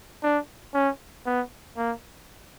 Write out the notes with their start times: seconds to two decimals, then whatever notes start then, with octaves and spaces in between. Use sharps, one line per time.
0.23 D4
0.74 C#4
1.26 B3
1.77 A#3